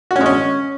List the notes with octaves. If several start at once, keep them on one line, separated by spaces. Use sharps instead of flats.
F#4
C#4
G#3
C#4